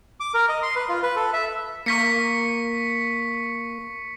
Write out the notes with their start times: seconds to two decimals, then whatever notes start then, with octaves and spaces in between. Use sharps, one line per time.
0.20 D6
0.34 A#4
0.49 D#5
0.63 C6
0.76 B4
0.89 F4
1.03 B4
1.16 A4
1.33 E5
1.86 A#3 C#6 B6 C#7